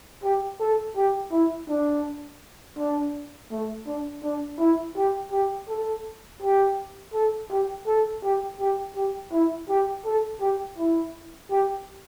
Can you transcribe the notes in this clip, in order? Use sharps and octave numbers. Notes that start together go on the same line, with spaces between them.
G4
A4
G4
E4
D4
D4
A3
D4
D4
E4
G4
G4
A4
G4
A4
G4
A4
G4
G4
G4
E4
G4
A4
G4
E4
G4